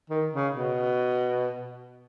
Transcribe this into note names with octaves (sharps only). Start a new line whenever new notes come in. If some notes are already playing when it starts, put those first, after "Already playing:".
D#3
C#3
B2